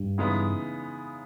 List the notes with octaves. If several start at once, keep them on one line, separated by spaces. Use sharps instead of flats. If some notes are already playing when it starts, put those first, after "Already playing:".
Already playing: G2
C#3 E3 G#3 B3 D#4